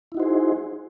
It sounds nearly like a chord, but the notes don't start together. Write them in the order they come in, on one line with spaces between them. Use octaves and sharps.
E4 D#4 F#4 C5 G#4